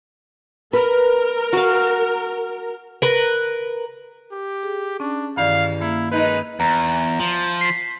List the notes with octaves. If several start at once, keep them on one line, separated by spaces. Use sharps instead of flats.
A#4 B4
F#4 F5
A#4 B4
G4
G#4
C#4 D4
E2 G2 D#3 D5 F5
A#3 E4
G#3 D#4 A#4 B4
E2 A#5
F3
B6 C7